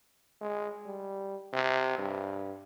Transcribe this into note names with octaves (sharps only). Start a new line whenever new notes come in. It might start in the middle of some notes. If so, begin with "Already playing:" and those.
G#3
G3
C3
G2